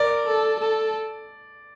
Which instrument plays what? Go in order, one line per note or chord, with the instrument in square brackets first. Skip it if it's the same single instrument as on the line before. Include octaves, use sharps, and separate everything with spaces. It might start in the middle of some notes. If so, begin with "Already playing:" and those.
Already playing: [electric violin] A#4 [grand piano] D5
[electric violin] A4
A4